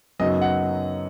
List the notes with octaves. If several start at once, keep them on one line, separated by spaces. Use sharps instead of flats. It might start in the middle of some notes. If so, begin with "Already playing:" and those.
F#2 C#3 F#3 B3 D#4 D#5
F#5